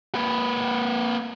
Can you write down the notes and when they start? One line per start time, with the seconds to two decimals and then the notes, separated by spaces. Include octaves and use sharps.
0.15 A#3 B4